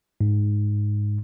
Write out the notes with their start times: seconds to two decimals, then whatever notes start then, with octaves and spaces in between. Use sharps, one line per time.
0.21 G#2